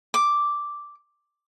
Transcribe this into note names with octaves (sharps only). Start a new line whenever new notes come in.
D6